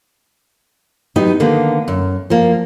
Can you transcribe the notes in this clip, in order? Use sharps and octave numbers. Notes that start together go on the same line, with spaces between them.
F#3 B3 D#4 G4 D#5
D3 D#3 A#3 B3
F#2
F3 A#3